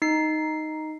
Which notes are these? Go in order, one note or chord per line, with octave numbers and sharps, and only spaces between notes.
D#4 C7